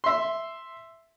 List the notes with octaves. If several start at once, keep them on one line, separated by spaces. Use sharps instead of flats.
E5 C6